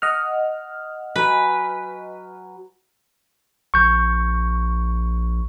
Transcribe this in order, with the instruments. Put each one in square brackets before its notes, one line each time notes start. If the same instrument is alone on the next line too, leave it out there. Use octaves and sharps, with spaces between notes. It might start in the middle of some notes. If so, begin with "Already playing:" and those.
[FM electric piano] D#5 F#5 F6
[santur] F#3 G#5 [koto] B4
[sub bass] A#1 [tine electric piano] C#6 G6